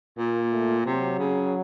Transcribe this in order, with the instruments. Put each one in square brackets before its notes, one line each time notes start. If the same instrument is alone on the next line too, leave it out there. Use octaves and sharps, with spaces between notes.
[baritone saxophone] A#2 [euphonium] A#3
[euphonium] A3
[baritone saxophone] C3 [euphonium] F#3
[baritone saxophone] C#3